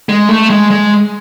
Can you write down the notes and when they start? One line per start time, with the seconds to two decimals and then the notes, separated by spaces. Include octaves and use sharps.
0.09 G#3
0.29 A3
0.50 G#3
0.71 G#3